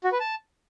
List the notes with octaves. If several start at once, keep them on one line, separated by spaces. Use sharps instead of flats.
F#4
B4
A5